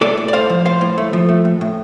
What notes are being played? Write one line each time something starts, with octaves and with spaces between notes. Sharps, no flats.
A2 A4 D5
A2
D5
A3 C5 F5
F3
A2 C5 F5
A2
A3
F3
A3
A2
A2